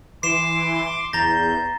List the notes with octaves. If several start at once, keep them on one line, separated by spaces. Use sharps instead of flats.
E3 C6 D6 C7 E7
E2 A#5 G6 A6 A#6